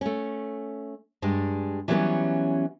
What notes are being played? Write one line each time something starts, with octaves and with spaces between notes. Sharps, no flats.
A3 C#4
G2 G3 G#3
E3 F#3 G3 A3 B3 C#4